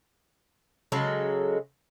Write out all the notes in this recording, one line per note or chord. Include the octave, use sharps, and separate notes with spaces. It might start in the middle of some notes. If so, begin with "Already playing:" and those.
C#3 F#3 G#3 A4